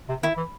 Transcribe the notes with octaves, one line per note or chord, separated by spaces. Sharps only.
C3
D#3 E4
E3